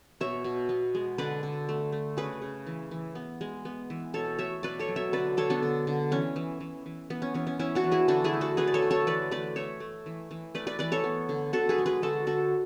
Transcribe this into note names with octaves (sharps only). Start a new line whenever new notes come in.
B2 C#5 E5
B2
B3
G#3
D3 B4 D5
D3
A3
A3
C#3 G#4 B4
C#3
E3
E3
B3
G#3
B3
E3
B2 A4 C#5
A3 C#5 E5
B2 B4 D5
A4 C#5
F#3
C#5 E5
D3 B4 D5
D3 A4 C#5
B3 D4
D3
D3
E3 C#4
E3
E3
E3
E3 B3
C#4
E3 C#4
C#4
E3 C#4 E4
D4 F#4
E3
E4 G#4
D3 D4 F#4
E4 G#4
A3
F#4 A4
A3 G#4 B4
D5
A4 C#5
D3
A4 C#5
E3 B4 D5
A3 B4 D5
A3 C#5 E5
A3
E3
E3
A3 B4 D5
B4 D5
E3 B4 D5
A4 C#5
B3
D3
D3 F#4 A4
G#4 B4
G#3
G#4 B4
D3 F#4 A4
D3 F#4 A4